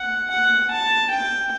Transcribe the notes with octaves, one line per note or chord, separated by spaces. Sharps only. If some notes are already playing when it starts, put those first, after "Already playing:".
Already playing: F#5
F#5
A5
G5